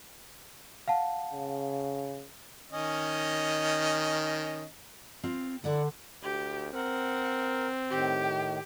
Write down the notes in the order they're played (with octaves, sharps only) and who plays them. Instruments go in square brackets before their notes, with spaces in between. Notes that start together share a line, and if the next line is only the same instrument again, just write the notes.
[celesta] F5 F#5 A5
[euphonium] C#3
[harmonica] D#3 C#4 D#5
[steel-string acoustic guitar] C4 F4
[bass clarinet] D3 [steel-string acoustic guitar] E4 D5 F#5
[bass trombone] D2 [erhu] G4
[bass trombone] C4 [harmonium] A#4 [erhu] F#5
[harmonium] A2 D#3 [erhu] G4